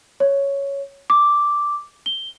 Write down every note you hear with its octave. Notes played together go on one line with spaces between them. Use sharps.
C#5
D6
G7